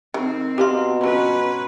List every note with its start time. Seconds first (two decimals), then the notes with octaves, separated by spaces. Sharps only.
0.14 D#3 C4
0.58 B2 G4 D#5 F5 A#5 C6
1.01 F3 F#3 C#4 B4